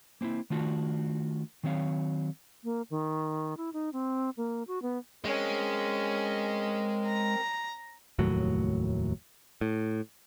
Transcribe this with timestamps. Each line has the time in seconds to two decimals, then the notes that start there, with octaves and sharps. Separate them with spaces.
0.21 A#3 C4 D#4 E4
0.50 D#3 A3 D4 F4 F#4
1.63 D#3 F#3 C4 C#5 F5
2.64 A#3
2.90 D#3
3.57 E4
3.73 D#4
3.93 C4
4.37 A#3
4.68 F#4
4.82 B3
5.25 G#3 C4 C#4 A#4
7.06 A#5
8.19 F1 D#2 A2 F#3
9.61 A2